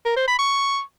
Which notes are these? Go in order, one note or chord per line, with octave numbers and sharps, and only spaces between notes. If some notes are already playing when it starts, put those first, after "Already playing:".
A#4
C5
B5
C#6